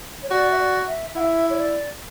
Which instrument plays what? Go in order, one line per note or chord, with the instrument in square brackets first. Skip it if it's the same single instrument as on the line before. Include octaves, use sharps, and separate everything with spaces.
[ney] C#5
[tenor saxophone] F#4 [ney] D5
[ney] E5
D5
E5
[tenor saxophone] E4 [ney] F#5
[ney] E5
C#5
D5